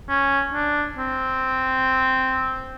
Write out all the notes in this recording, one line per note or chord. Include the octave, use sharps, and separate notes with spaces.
C#4
D4
C4